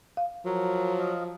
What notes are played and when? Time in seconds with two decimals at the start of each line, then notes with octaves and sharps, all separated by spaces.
0.17 F5
0.46 F3 F#3 A#4
0.99 D#5 F5